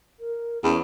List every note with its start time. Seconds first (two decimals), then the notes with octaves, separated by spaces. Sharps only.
0.20 A#4
0.64 E2 C#4